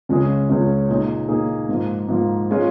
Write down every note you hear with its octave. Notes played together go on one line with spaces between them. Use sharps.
C#2 C#3 G#3 C#4 G#4
C#2 C#3 G#3 C#4 G#4
A#2 A#3 D#4 G#4
A#2 A#3 D#4 G#4
G#2 F3 A#3
G#2 F3 A#3
G#3 C#4 F4